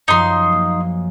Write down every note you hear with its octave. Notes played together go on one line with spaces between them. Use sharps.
F#2 F3 D#4 C6
A#3